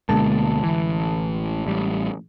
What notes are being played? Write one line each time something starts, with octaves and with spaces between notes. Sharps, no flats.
D2 B2 D3 G#3 A#3 A5
A1 E3
A1 G3